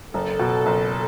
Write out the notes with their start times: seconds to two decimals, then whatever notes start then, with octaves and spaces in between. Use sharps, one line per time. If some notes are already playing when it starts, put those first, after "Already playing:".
0.14 F#1 A4
0.39 B2
0.66 F#1